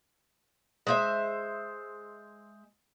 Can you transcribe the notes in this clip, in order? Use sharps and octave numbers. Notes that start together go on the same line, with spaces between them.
G#3 C5 E5